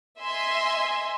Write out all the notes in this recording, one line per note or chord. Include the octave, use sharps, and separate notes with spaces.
D#5 E5 G#5 C6